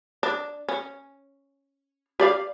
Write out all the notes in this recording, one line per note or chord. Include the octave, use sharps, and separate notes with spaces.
D4
C#4
G4 D5 F5